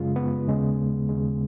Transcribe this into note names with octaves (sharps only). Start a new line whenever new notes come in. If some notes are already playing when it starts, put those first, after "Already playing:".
Already playing: F#2 C#3 G#3 F4
B3
D#2 C#3 G#3
D#2 C#3 G#3